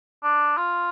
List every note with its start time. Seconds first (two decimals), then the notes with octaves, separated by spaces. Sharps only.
0.23 D4
0.57 F4